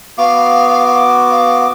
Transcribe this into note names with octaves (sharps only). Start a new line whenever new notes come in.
B3 F#4 F5 D6
F5